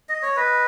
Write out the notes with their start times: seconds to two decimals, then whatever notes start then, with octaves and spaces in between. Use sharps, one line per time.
0.09 D#5
0.22 C#5
0.36 B4 D#5